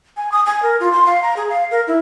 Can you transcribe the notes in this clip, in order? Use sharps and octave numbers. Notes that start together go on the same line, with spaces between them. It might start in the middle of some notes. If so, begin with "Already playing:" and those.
G#5
D#6
G#5
A#4
F4
C6
F5
A#5
G#4
F5
A#4
E4